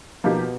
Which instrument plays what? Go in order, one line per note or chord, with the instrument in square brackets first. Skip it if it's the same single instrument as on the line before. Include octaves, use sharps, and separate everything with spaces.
[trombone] B2 [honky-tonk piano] F3 A#3 D#4 G4